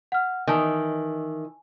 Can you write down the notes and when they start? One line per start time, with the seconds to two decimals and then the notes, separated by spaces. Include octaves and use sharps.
0.12 F#5 F6
0.47 D#3 E3 G#5 A5